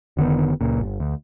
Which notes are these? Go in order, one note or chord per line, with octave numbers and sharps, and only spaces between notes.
F1 D3 D#3 B3
C#2 A#2
G1
D2